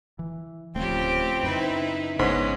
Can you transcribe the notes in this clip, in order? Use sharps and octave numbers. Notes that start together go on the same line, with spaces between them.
E3
D1 C#3 F3 A3 C4 G4
F#2 C#3 D#4 E4 B4
G#1 G#2 C#3 G#3 B3 C#4